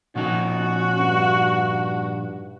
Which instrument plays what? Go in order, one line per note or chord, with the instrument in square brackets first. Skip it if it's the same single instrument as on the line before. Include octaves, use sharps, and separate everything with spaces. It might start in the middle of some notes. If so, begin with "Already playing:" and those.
[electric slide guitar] A#2 F3 D#4 [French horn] C#4 [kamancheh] F#4
[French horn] G2